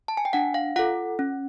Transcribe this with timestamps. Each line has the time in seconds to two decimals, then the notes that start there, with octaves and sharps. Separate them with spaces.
0.08 A5
0.17 G#5
0.25 G5
0.33 D4 F#5
0.54 F5
0.76 F4 A4 F#5
1.19 C#4